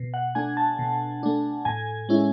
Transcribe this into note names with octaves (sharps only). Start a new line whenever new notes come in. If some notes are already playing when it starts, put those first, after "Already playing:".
Already playing: B2
F#5
A3 D4 G#5
A5
B2
A3 D4
A2 G#5
G#3 C#4 E4